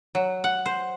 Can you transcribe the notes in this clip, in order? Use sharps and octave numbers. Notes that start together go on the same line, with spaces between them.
F#3
F#5
C5